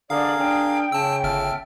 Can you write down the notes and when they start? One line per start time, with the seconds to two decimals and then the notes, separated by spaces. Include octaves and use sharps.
0.10 D3 G#4 A#4 D5 F5
0.39 D4 G5
0.92 C#3 A5 E6
1.24 G1 E5 A5 F6